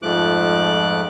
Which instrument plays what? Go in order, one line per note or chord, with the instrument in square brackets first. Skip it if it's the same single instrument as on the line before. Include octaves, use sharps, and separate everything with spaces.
[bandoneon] F2 G#2 F3 A3 D6 F#6